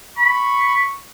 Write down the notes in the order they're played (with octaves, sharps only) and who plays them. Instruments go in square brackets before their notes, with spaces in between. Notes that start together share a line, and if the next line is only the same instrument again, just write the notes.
[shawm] B5 [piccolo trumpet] C#6